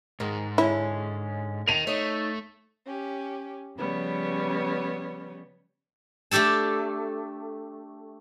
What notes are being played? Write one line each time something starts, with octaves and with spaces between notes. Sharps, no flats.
G#2 D#3 G#3
D3 G#3 C#4 E4
A#4 D#5 D#7 F7
A3 D#4 C#5
C#4 G4
C#3 F3 G3 B3 C#5
A3 D4 G4 A4 A5